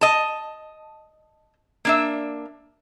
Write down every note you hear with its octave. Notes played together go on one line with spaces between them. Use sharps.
D#5 A5
A#3 D4 E5